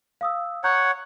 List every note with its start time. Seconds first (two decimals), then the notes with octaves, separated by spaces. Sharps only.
0.21 F5 D#6 E6
0.64 C#5 F#5 A#5 G6